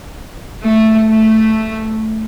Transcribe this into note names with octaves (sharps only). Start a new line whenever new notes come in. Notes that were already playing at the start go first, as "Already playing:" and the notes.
A3
A3